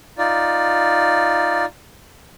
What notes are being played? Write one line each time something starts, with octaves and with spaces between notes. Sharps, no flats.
D#4 F4 D5